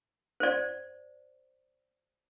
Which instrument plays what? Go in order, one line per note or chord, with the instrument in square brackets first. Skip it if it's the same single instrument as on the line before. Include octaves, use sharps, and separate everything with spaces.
[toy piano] C5 D5